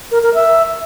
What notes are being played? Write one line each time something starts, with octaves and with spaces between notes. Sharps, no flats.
A#4
A#4
E5